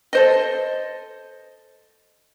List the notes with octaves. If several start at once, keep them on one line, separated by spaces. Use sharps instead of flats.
A4 C5 D#5